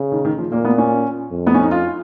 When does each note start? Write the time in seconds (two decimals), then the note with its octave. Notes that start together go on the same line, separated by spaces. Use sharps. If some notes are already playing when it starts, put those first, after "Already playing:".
Already playing: C#3
0.12 D#3
0.25 D#3
0.38 F3
0.52 A#2 A#3
0.65 B3
0.78 C#4
1.31 F2
1.47 B3
1.54 C#4
1.63 D#4
1.71 F4